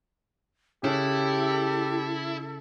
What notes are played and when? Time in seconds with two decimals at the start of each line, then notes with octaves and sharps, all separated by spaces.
0.84 C#3 E4 G4 A4